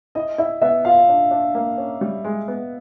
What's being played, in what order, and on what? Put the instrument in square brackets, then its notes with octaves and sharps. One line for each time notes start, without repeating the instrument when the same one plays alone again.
[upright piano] E4 [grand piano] D#5
[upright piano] E4 [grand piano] E5
[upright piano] B3 [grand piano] E5
[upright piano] F4 [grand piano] F5
[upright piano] D4
D4
A#3
C#4
G3
G#3
B3